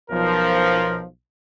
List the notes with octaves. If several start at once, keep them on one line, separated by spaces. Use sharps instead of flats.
B1 F3 A#4